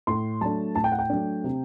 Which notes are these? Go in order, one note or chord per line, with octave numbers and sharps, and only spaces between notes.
A2 C6
F#3 A3 D4 A5
A2 A5
G5
F#5
G5
F#3 A3 D4
C3